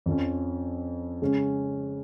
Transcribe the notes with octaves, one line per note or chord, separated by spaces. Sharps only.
F2 F3 C#4
C#3 G#3 C#4